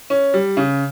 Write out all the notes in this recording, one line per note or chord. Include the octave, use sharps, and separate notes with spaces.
C#4
G3
C#3